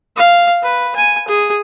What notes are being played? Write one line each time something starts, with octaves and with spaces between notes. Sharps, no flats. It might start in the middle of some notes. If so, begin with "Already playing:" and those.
F5
B4
G#5
G#4